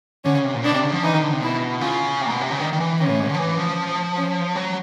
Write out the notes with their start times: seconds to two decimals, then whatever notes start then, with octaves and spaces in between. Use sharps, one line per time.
0.25 D3 C#4
0.35 C#3
0.44 C3
0.55 A#2
0.63 B2 D4
0.74 C3
0.83 C#3
0.93 F3
1.03 E3 D#4
1.13 D#3
1.22 D3
1.33 C3
1.42 B2 E4
1.81 C#3 F4
2.21 C3
2.26 A#2
2.30 B2
2.41 C3
2.51 C#3
2.60 D#3 D4
2.73 D#3
2.80 E3
2.99 D#3 C#4
3.09 A2
3.20 G#2
3.29 D3
3.34 F3
3.39 E3
3.58 F3
4.17 C#4
4.56 F#3